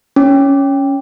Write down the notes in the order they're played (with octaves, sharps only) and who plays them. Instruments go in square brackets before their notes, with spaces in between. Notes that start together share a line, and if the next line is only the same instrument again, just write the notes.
[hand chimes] C#4